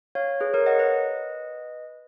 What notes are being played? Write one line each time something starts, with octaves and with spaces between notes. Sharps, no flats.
C#5 F5
G#4 B4
A#4 C#5
D#5 F#5
B4 D#5